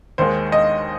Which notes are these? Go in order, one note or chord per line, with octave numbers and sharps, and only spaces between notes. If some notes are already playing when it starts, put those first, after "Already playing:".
D#2 D#3 G#3 C5
D#5